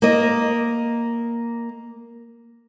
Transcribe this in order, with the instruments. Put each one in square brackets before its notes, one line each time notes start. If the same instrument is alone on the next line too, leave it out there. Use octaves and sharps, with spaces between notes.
[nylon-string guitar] A#3 D#5